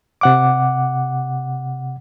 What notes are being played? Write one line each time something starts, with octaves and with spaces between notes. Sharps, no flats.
C3 F#5 D6